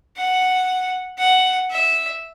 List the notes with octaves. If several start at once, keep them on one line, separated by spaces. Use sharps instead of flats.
F#5
F#5
E5